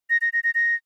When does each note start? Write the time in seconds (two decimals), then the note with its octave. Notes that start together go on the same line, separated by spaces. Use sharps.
0.10 A#6
0.21 A#6
0.33 A#6
0.44 A#6
0.55 A#6